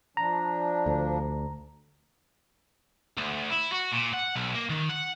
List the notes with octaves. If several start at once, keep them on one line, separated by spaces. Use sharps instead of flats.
F3 D4 A#5
D2
D2
E4
F#4
A#2
F#5
B1
A#3
D#3
F#5